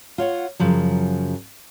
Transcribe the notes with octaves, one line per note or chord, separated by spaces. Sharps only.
F4 C#5 F#5
F#2 C#3 F3 F#3